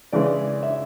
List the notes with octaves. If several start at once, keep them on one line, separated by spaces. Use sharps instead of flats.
C#3 E3 G#3 C#4 D5
E5